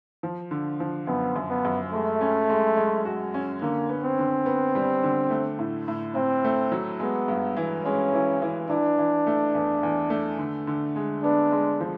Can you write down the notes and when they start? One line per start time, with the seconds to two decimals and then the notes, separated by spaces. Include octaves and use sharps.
0.23 F3
0.51 D3
0.80 F3
1.07 F#2 B3
1.36 F#2
1.50 B3
1.65 F#2
1.93 G#3 A3
2.21 C#4
2.50 G#3
2.77 G#3
3.05 F#4
3.34 C#4
3.62 D3 A#3
3.89 B3
4.04 C4
4.19 D3
4.46 B3
4.75 G3
5.03 D3
5.30 A3
5.59 A2
5.88 A2
6.15 A2 C4
6.44 A3
6.72 F#3
7.00 G#3 B3
7.28 G2
7.57 E3
7.85 G#3 C#4
8.13 E3
8.42 E3
8.70 E3 D4
8.98 E3
9.27 A3
9.55 E2
9.83 E2
10.10 A3
10.39 D3
10.67 D3
10.96 G#3
11.23 B3 D4
11.52 G#3
11.80 F3